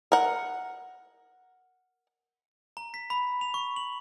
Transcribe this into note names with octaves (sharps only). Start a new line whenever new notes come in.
A#4 F#5
A#5
B6
B5
F7
C#6
F#7